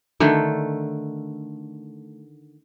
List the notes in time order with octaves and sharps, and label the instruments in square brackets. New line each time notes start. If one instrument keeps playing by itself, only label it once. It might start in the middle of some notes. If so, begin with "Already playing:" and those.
[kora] D3 D#3 A3